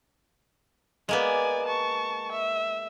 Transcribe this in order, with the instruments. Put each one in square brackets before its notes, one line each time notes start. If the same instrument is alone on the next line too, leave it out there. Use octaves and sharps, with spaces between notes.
[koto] G#3 A#3 B3 [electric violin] D5 G#5
[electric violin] A5 C#6
E5